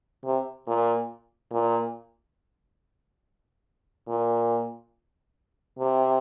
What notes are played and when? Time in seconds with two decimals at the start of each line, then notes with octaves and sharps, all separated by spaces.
0.25 C3
0.67 A#2
1.52 A#2
4.08 A#2
5.79 C3